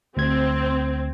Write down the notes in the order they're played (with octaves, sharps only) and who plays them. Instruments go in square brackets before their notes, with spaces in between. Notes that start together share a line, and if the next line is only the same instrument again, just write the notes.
[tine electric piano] D2 G#6 [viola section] C4